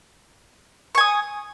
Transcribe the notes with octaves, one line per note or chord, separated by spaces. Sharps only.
G#5 C#6 D#6